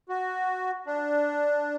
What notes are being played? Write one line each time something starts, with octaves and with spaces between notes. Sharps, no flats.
F#4
D4